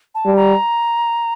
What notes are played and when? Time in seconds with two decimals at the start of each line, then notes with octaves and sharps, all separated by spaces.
0.15 A5
0.25 G3
0.36 A#5